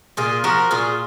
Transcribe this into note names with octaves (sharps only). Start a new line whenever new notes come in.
A#2 F4 G#4
F3 F#4 A#4
A#2 F4 G#4